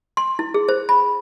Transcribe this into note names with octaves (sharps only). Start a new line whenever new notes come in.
C6
E4
G#4
C5
B5